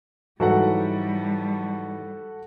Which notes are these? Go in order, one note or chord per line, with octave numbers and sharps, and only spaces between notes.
G#2 E3 F#3 G3 F#4 A4 F#5